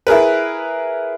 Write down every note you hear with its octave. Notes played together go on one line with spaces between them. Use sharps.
E4 G#4 A#4 B4